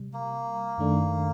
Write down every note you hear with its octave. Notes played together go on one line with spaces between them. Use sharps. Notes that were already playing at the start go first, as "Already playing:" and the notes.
Already playing: C3 G3
A#3
F#2 D#3 A3 D4